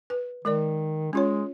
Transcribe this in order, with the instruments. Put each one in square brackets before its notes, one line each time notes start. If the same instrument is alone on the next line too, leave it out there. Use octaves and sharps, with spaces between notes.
[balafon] B4
[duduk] D#3 [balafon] G#3 A#4 D5
[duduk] G#3 [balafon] C#4 F4 C#5